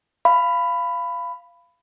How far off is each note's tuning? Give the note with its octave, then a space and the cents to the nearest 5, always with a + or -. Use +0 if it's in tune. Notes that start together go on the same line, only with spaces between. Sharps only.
F5 -20 B5 +15